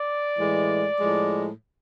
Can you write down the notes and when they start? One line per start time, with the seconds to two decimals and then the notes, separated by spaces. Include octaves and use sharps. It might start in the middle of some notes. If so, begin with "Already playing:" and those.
Already playing: D5
0.37 A2 E3 G#3
0.99 A2 F3 G#3